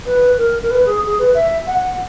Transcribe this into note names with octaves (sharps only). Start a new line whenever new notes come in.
B4
A#4
A#4
B4
G#4
G#4
B4
E5
F#5